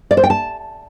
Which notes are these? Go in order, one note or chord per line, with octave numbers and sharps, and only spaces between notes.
D5
C5
G5
A5